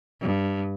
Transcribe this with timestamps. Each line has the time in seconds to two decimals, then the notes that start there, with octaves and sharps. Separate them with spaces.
0.21 G2